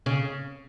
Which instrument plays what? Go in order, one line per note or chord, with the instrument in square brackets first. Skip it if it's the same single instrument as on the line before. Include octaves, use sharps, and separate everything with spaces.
[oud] C#3